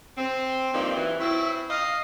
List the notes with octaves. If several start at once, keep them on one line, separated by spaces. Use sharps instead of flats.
C4
G2 F3 A#3 C4 D#4
F#2 E3
C4 C#4 E4
D#5 F5